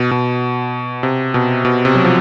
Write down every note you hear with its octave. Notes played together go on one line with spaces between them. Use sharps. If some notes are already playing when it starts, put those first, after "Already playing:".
Already playing: B2
B2
C3
B2
B2
C3
F#3
F3